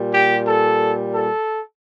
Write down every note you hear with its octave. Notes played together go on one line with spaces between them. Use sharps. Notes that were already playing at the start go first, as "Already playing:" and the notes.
Already playing: A#2 G3
G4
A4
A4